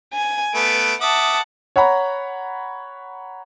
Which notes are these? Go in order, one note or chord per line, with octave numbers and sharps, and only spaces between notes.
G#5
A3 B3 B4 D7
E5 F#5 A5 D6 D#6
C#5 F#5 A#5 B5